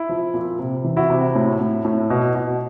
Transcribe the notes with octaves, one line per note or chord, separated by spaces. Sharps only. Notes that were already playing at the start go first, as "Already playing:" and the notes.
Already playing: E4
F3
A#2
C3
E3
E4 F#4
C3
A2
A2
A2
B2
B2